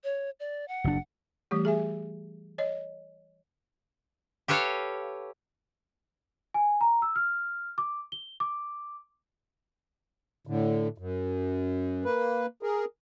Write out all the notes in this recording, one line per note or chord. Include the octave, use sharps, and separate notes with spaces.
C#5
D5
F#5
F#1 D4
E3 G3 A3 G4
G#4 E5 G#5
C#5 D#5
G4 A4 B4 C#5 F5
G#5
A#5
E6
F6
D6
G7
D6
A2 D3
F#2
A#3 B4
G#4 A#4